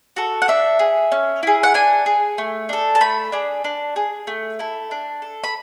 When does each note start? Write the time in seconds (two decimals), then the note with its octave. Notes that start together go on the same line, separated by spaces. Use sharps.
0.16 F#4 A4
0.42 F#5
0.48 D4 E5
0.79 G#4
1.12 C#4
1.43 E4 G#4
1.63 F#5
1.74 D4 G#5
2.06 G#4
2.38 A3
2.69 D4 A4
2.95 A5
3.01 A3 B5
3.32 D4 G#4
3.64 D4
3.96 G#4
4.27 A3
4.59 E4 A4
4.91 D4
5.22 A4
5.44 B5